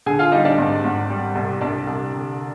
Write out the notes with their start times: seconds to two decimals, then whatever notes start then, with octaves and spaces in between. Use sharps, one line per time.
0.06 D3 G#4 G#5
0.19 F4 F5
0.32 G3 D#4 D#5
0.45 D4 D5
0.58 G#1
0.84 G#1
1.10 G3
1.35 C2
1.61 C2 D4 D5
1.87 C2
2.12 D3